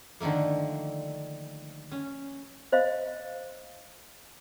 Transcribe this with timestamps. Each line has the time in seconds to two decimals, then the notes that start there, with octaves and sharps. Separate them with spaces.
0.21 D3 D#3 F3 A3 A#3
1.92 C#4
2.72 C5 D#5 F5